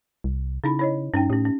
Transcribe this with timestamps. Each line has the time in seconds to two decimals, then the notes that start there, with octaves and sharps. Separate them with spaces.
0.24 C2
0.64 C#3 D#4 E4 B5
0.79 E4 C#5 D#5
1.14 G2 C#4 D#4 G5
1.30 A2 C#4 G4
1.45 C#4